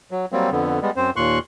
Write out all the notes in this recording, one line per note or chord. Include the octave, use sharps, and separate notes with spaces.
F#3
F#3 G3 A#3 C4
F2 D3 B3
G3 G#3 B3
F#2 C4 C5
D#2 A#2 C6 C#6 F#6